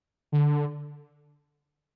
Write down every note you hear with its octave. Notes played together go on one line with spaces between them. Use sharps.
D3